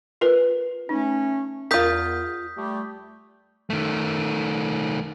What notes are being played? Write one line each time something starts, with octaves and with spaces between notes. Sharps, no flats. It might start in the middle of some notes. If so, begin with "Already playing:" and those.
F4 A#4 B4
A3 C#4 D#4
E2 F4 A#4 D#6 G6 B6
G3 A3 G4
D#3 A3